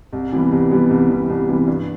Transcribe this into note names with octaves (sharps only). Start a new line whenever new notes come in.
C2
C3 E3 G3 B3
C2
C3 E3 G3 B3
C2
C3 E3 G3 B3
C2
C3 E3 G3 B3
G2